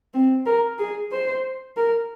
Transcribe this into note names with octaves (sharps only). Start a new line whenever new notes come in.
C4
A#4
G#4
C5
A#4